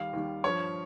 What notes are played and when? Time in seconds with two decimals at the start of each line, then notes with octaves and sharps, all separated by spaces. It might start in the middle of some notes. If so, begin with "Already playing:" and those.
Already playing: D#2 D#3 G3 F5
0.13 D#2 D#3 G3
0.44 G2 F3 C#5